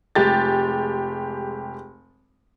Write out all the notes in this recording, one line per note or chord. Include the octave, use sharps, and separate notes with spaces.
F1 G#3 G4 A6